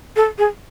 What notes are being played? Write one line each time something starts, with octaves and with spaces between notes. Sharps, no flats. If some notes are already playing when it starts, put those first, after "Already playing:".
A4
G#4